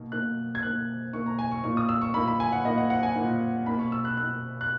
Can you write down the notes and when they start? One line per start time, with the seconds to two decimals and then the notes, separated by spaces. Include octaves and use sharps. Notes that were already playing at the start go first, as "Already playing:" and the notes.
Already playing: B2 A#3 D#4
0.12 B2 A#3 D#4 F#6
0.55 G#6
0.62 B2 A#3 D#4 F#6
1.13 B2 A#3 D#4 C#6
1.26 A#5
1.39 G#5
1.52 C#6
1.64 A#2 A#3 D#4 C#6
1.77 D#6
1.89 E6
2.02 C#6
2.14 A#2 A#3 D#4 B5
2.28 B5
2.40 G#5
2.52 F#5
2.65 A#2 A#3 D#4 D#5
2.78 F#5
2.90 F#5
3.03 G#5
3.16 A#2 A#3 D#4
3.66 B2 A#3 D#4 B5
3.79 C#6
3.92 E6
4.05 F#6
4.17 B2 A#3 D#4 F#6
4.61 F#6